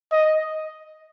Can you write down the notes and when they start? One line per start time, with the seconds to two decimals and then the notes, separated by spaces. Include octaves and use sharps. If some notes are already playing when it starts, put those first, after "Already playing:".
0.12 D#5